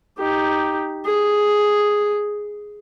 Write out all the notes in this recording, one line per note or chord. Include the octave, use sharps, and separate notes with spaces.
D#4 G4
G#4